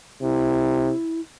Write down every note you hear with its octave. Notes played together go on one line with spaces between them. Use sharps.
C3 E4